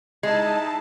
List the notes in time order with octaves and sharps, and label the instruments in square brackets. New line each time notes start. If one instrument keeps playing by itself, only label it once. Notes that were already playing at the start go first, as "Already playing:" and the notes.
[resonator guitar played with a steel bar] G#3 [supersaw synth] D#4 E4 A5